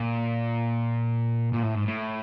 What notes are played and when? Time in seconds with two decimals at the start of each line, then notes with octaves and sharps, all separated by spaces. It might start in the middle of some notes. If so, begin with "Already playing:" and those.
Already playing: A#2
1.53 A#2
1.63 A2
1.75 G#2
1.85 A2